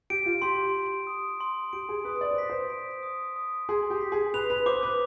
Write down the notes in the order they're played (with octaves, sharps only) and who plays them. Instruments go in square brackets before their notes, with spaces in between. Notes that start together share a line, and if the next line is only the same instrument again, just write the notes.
[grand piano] G4 [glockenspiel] D7
[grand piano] F4
[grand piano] G4 [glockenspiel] C6
[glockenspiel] C6
D#6
C6
[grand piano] G4 [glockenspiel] D7
[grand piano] G#4
[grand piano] B4 [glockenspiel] D#6
[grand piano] D5
C5
[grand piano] B4 [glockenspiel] B6
[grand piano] C5
[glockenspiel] D7
D#6
D#6
[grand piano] G#4 [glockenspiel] C6
[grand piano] G4
[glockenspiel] B6
[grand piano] G#4
[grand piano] B4 [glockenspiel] F7
[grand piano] B4
[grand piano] C5 [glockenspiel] D6
[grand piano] B4